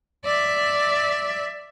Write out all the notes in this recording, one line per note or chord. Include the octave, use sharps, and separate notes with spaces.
D5 E5